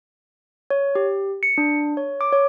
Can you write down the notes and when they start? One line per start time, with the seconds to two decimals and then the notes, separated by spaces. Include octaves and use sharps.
0.70 C#5
0.95 G4
1.43 C#7
1.58 D4
1.97 C#5
2.21 D6
2.33 C#5